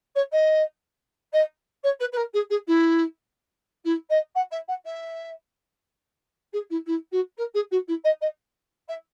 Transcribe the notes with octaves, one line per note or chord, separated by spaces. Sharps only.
C#5
D#5
D#5
C#5
B4
B4
A#4
G#4
G#4
E4
E4
D#5
F#5
E5
F#5
E5
G#4
E4
E4
F#4
A#4
G#4
F#4
E4
D#5
D#5
E5